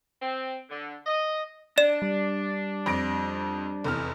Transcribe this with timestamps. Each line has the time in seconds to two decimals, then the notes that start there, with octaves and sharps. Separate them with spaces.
0.22 C4
0.70 D3
1.07 D#5
1.78 D4 D5 E7
2.02 G3
2.86 F2 A#6 D7
3.84 F1 E2 F6